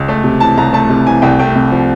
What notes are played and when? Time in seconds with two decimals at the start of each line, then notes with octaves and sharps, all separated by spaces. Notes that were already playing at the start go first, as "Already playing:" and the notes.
Already playing: C#2
0.08 A3
0.24 C3
0.40 E3 A5
0.57 C2 A#5
0.73 A3 A5
0.89 C3
1.06 E3 G#5
1.22 C2 G5
1.39 A3 G5
1.55 C3
1.72 F3